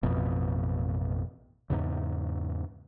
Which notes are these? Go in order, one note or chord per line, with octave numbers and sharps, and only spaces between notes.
A1 F2 B2
E2 G#2 C#3